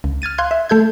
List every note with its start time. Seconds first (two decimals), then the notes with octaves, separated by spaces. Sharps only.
0.04 C#2
0.22 F6 G#6 A6 D#7
0.38 F5 C6 F#6 G#6
0.51 E5
0.69 A3 A4 G6 G#6